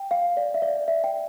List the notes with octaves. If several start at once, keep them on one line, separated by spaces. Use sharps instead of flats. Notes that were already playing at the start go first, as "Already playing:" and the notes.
Already playing: G5
F5
D5
E5
D5
E5
G5